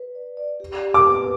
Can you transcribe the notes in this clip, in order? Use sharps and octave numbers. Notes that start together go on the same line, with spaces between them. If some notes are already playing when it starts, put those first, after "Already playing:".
Already playing: B4
D5
D5
G4
G4
D6
B4